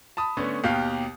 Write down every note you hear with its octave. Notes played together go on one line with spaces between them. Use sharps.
A5 B5 D#6
D3 A3 B3 C#4
D#2 B2 G4 F5